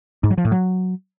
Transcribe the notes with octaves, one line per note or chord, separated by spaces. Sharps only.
G#2
F#3
F3
A2
F#3